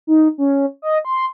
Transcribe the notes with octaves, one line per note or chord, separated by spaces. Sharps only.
D#4
C#4
D#5
C6